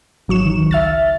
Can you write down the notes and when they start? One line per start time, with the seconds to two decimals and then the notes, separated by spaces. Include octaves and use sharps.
0.28 G#1 F#3 C#6 E7
0.46 D#3
0.59 C#2
0.71 E5 F6 A6